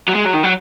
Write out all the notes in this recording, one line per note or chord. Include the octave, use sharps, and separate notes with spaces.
F#3
G#3
F#3
D#3
F#3